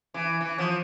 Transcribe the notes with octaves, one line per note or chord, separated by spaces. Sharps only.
E3
E3
F3